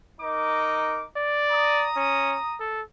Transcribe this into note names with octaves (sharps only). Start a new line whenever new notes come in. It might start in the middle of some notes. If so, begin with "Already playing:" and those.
D#4 A#4 D6
D5
A#5 D#6
C#4
A4